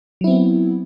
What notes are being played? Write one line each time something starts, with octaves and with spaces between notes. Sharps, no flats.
F#3 B3 C4 E4